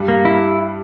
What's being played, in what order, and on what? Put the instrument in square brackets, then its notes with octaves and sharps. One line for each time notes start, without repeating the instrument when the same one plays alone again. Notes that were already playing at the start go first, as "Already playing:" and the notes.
Already playing: [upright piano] G2 G3
[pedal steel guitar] A#3
E4